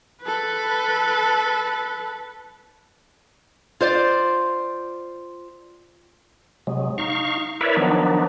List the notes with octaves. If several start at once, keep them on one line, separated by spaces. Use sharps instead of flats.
A4 B4
F4 C5 D5
C3 F#3 G#3
D#4 F5 C#6
E4 A#4 B4 C#5 D5 E5
D#3 F3 F#3 B3 D4 D#4